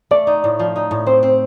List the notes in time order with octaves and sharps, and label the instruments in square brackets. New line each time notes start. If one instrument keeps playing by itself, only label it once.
[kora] A3 [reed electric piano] D5
[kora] D#4
A2
F3
D#4
A2
[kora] C4 [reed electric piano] C5
[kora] C4